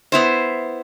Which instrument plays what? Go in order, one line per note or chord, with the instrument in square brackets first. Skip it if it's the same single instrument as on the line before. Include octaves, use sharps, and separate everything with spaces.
[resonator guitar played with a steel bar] B3 E4 C5